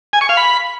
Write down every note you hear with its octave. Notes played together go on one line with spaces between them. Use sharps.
G#5
C#6
F5
B5